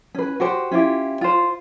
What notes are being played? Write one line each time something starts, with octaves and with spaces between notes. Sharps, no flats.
C#4 B4
F#4 G4 C5
C#4 E4 F4 G4
F4 C5